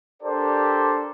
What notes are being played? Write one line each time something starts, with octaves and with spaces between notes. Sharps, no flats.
D4 G4 A4 A#4 C5 D5